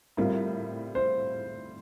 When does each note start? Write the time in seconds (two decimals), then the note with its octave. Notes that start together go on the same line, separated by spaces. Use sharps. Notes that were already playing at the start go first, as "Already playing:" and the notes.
0.17 A2 G3 C4 F4 A#4
0.95 C5